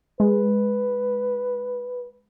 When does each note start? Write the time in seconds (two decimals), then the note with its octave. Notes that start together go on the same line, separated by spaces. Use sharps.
0.20 G#3 B4